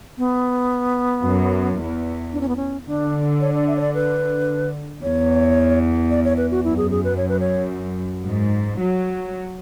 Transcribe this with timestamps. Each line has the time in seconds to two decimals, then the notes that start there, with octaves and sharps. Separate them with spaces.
0.18 B3
1.26 F#2
1.80 E2
2.33 D4
2.41 C#4
2.49 B3
2.56 C#4
2.87 D3 D4
3.41 C#5
3.55 D5
3.67 E5
3.76 C#5
3.81 D5
3.94 B4
5.03 E2 C#5
6.11 D5
6.24 C#5
6.37 B4
6.51 F#4
6.63 F#2 E4
6.77 G#4
6.91 G#4
7.04 B4
7.17 C#5
7.29 B4
7.40 C#5
8.25 G#2
8.80 F#3